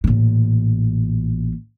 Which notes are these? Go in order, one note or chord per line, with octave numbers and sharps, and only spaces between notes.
A1 A#2